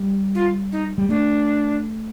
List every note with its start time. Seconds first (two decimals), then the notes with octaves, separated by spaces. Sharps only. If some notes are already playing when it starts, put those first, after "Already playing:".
Already playing: G3
0.35 F4
0.72 D#4
0.98 G3
1.09 A3 D4